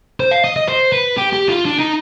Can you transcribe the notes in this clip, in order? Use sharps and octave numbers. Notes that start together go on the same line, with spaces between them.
C5
F5
D#5
D#5
C5
B4
G4
G4
F4
D4
D#4